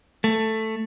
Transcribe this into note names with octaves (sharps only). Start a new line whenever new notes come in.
A3